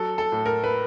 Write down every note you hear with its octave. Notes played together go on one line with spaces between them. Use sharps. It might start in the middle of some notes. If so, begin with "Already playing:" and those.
Already playing: F#3 A4
A4
A2
A#4
B4